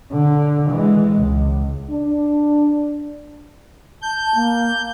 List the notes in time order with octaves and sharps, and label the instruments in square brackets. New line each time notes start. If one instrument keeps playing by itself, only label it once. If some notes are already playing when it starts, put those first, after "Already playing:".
[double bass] D3
E3 G#3
C#2
[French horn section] D4
[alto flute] A5 [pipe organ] G6
[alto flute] A#3